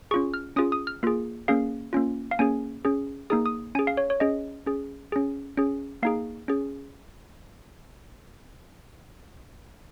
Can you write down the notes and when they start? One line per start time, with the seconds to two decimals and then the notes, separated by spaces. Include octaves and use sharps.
0.11 C#4 F4 G#4 C#6
0.34 F6
0.56 C#4 F4 G#4 D#6
0.72 D#6
0.87 F6
1.03 A#3 F4 G#4
1.48 A#3 C#4 G#4 F5
1.93 A#3 C#4 F4
2.31 F5
2.39 A#3 C#4 G#4 G#5
2.85 C#4 G#4
3.30 A#3 D#4 G#4 D#6
3.46 D#6
3.75 C#4 G#5
3.79 G#4
3.87 F5
3.97 C#5
4.10 C#5
4.20 C#4 G#4 D#5
4.66 C#4 G#4
5.12 C#4 G#4
5.57 C#4 G#4
6.03 A#3 D#4 G#4 F5
6.48 C#4 G#4